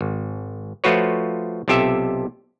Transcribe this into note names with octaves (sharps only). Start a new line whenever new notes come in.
G#1
F3 A3 F4 F#4 B4 C#5
B1 C3 F4 G4 A4 E5